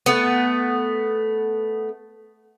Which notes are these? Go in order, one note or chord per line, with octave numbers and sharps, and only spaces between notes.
A3 B3